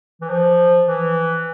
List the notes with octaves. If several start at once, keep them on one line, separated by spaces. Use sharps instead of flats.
E3
F3
E3